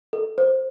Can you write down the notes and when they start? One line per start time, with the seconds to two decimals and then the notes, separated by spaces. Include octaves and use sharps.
0.13 A4
0.38 C5